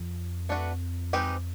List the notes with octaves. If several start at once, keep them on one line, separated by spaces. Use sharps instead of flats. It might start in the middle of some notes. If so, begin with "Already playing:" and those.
Already playing: F2
A3 D4 F#4 B4
G#3 C4 D#4 G4 B4